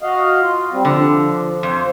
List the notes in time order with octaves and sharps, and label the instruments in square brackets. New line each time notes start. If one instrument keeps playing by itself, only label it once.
[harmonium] F#4 D#5 F5
F4
G3 C4
[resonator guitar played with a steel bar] D3 [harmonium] F3
[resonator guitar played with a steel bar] F2 [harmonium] C5